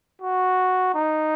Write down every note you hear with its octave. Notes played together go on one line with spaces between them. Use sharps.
F#4
D#4